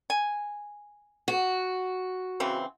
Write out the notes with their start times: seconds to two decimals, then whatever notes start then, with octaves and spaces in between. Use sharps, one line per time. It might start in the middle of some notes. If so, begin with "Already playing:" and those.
0.10 G#5
1.28 F#4
2.40 C#3 E3 C4